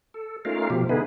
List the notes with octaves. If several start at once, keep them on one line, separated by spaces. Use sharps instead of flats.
A4
A3 C#4 D#4 F4 A#4 F5
B2 F3 G4
D3 B3 D#4 E4 G#4 B4